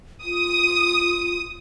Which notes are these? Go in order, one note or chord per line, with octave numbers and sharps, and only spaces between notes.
F4 D#6